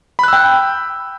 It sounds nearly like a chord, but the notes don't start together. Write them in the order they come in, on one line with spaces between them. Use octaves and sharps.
B5 F#6 E6 G5